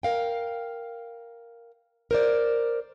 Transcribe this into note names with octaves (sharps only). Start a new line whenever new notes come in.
A#4 F5 G5
A#4 C5 D5